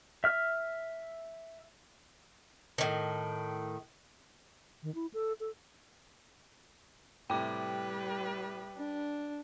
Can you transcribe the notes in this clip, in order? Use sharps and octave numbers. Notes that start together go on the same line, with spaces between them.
E5 F6
A2 D#3
D#3
E4
A4
A4
A2 C3 G3 B4 G5 D6
D4